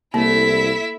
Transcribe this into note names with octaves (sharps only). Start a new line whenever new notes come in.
C2 A3 A#3 E4 E5